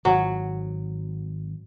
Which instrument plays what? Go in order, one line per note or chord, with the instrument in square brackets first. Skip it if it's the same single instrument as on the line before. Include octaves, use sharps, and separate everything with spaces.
[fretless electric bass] G#1 [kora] F#3